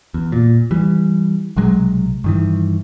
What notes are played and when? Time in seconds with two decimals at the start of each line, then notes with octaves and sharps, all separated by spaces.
0.14 E2
0.32 A#2
0.71 E3 G3
1.57 B1 C3 F#3 G#3
2.24 G2 D#3 E3